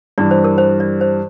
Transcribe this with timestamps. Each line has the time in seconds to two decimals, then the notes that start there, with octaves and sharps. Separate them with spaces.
0.18 G2 E3 G3 D5
0.31 C5
0.44 A#4
0.58 C5
0.80 D5
1.01 C5